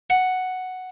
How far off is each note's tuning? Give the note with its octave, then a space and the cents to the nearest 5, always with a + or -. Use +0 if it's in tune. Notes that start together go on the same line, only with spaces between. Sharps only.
F#5 +0